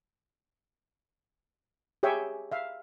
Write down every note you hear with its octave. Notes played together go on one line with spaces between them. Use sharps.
G4 G#4 C#5 E5 G5 G#5
E5 F5